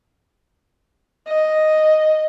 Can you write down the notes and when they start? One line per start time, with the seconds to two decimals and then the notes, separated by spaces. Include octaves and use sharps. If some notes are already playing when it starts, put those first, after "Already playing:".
1.28 D#5